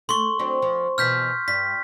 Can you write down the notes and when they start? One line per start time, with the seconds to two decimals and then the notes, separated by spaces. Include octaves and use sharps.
0.09 A3 C6 C#6
0.39 F#3 C4 D4
0.62 F3
0.98 B2 E3 F6 G6 B6
1.48 G2 B6